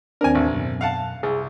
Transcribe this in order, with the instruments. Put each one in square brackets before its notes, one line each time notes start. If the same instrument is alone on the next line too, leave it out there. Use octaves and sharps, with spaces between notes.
[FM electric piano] D#2 C4 D4 [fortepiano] A#4 G#5
[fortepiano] A1
[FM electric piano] F#2 B2
[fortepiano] F5 F#5 A5
[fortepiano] C2 [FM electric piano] G#4